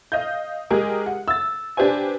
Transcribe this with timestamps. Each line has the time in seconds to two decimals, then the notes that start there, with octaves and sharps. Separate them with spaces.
0.12 D#5 F5 G6
0.70 G#3 G4 G#4 A#4
1.06 F#5
1.28 E6 A6
1.77 D4 G4 B4 C5 G#5